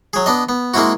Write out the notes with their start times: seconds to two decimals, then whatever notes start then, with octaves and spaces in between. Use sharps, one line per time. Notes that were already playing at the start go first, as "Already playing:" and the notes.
0.13 F#3 G#4
0.26 B3 D4 D#5
0.49 B3
0.74 G#3 A#3 C4 E4 F#4